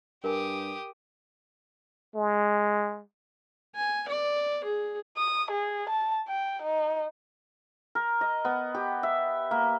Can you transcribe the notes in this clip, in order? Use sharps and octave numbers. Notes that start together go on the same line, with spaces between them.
G2 G4 A#4 G#5 D#6
G#3
G#5
D5
G#4
D#6
G#4
A5
G5
D#4
A#4
D#5
B3
G4
E5
A#3